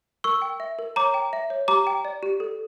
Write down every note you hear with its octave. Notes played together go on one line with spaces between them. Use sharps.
A#4 C#6 E6
G5
E5
A#4
C#5 A#5 D6
G5
E5
C#5
G4 A#5 D6
G5
D5
G4
A4